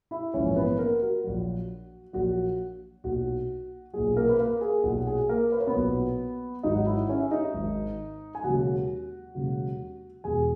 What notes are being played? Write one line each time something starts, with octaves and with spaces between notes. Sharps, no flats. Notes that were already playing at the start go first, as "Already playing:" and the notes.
E4 E5
A#1 G#2 E3 C#4 C#5
C#5
B3 B4
A#3 A#4
F#4
A#1 A#2 F#3
A#1 A#2 F#3 F#4
B1 A#2 F#3 F#4
B1 A#2 F#3 G#4
A#3 A#4
B4
A#3 A#4
G#4
B1 A#2 F#3 F#4
F#4
G#4
A#3 A#4
B4
C#5
B3 B4
B1 A#2 F#3
G#1 G#2 F#3 D#4 D#5
F#5
E4 E5
C#4 C#5
E5
D#4 D#5
G#1 G#2 F#3
G#5
E1 D#2 C#3 F#3 F#4 F#5
E1 D#2 C#3 F#3
E1 E2 B2 G#4 G#5